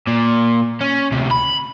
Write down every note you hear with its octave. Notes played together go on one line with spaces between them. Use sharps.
A#2
C#4
D2 C3
B5